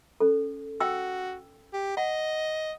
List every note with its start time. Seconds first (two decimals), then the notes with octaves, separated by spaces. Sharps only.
0.20 C#4 A4
0.80 F#4 G5 E6
1.74 G4
1.97 D#5 F#5